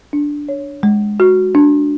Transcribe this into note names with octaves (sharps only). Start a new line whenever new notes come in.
D4
C#5
G#3
F#4
D4